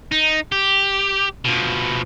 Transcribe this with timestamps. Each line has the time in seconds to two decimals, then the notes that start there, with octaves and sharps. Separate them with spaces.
0.12 D#4
0.52 G4
1.45 B2 F3